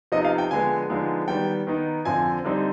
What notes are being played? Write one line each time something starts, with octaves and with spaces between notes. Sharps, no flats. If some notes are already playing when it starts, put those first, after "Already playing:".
C3 F3 B3 D#4 D#5
F5
G5
D3 F3 G#3 B3 G#5
D3 F3 G#3 B3 D#4
D#3 G3 B3 G5
D#3 B3 D#4
F2 D3 F3 C4 G#5
D3 G3 C4 D#4